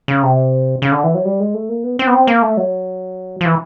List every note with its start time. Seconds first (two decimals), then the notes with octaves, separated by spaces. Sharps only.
0.08 C#3
0.23 C3
0.82 C#3
0.92 D3
1.04 E3
1.15 F#3
1.25 G3
1.40 G#3
1.54 A3
1.69 A#3
1.84 B3
1.99 C4
2.07 B3
2.14 C4
2.27 A#3
2.42 A3
2.57 F#3
3.41 F3
3.45 E3